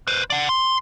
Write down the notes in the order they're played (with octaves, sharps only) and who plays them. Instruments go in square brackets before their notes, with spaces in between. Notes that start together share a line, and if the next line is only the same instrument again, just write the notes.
[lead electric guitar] B4 C5
D5 F#5
C6